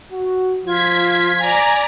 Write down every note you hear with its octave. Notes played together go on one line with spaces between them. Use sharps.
F#4
F3 F4 G#6 B6
D5 G#5 A#5